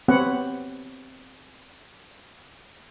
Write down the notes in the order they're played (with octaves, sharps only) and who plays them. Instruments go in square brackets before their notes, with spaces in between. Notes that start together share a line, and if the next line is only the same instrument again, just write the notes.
[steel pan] B3 C4 G4 B4 C#5 F#5